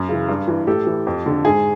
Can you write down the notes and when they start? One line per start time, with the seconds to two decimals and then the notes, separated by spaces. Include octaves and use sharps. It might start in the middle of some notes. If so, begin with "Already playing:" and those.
Already playing: F#2
0.09 C#3 E3
0.28 G2
0.48 E3
0.67 A2 G4 A4
0.87 E3
1.07 F2
1.26 D3
1.45 G#2 G#4